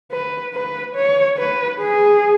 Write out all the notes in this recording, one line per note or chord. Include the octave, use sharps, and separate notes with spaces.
B4
B4
C#5
B4
G#4